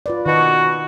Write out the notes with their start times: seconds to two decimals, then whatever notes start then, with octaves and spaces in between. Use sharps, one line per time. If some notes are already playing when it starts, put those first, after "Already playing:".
0.06 F4 B4 D5
0.26 B2 D#3 F#4